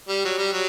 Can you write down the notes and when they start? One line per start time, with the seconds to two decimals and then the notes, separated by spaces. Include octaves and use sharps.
0.08 G3
0.25 F#3
0.38 G3
0.52 F#3